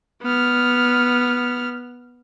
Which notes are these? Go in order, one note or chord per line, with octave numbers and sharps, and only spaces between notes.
B3 F6